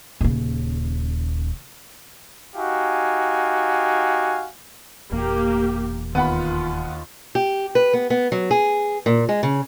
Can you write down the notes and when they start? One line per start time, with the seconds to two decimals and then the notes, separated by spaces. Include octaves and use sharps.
0.21 D#1 C#3
2.56 D#4 F#4 G4 F5 G#5
5.11 E1 E2 A#2 A#3 G4
6.15 D#2 B3 F4 F#5 B5
7.35 G4
7.75 B4
7.94 B3
8.10 B3
8.32 F#3
8.51 G#4
9.06 A#2
9.29 G#3
9.43 C#3